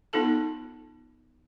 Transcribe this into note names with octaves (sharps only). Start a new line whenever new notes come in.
B3 D#4 F4 A4 A5